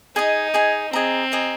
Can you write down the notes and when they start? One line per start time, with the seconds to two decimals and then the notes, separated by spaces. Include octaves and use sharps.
0.16 D#4 G#4 D#5 G#5
0.54 G#4 D#5 G#5
0.93 C4 G#4 D#5 A#5
1.32 G#4 D#5 A#5